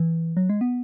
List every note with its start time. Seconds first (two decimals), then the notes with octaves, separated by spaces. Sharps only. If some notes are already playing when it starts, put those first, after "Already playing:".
Already playing: E3
0.37 F#3
0.50 G#3
0.61 B3